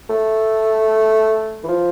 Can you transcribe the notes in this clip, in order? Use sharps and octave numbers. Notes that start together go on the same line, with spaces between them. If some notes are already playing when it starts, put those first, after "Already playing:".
A3
E3
F3